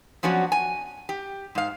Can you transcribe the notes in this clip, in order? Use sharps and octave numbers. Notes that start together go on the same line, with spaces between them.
F3 F#3 B3 C#4 D4 F#4
G#5
G4
G#2 F5